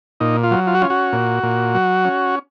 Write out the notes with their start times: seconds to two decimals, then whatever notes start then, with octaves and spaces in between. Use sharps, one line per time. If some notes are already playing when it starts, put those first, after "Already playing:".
0.20 A#2 D#4
0.43 F4
0.51 F#3
0.67 F4
0.75 F#4
0.82 C#4 F4
0.90 F#4
1.13 A#2
1.43 A#2
1.75 F#3
2.05 C#4